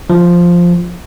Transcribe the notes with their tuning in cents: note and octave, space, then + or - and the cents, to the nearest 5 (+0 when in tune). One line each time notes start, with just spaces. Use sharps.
F3 +0